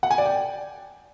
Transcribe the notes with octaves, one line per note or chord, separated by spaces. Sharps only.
F#5
G#5
D5
G5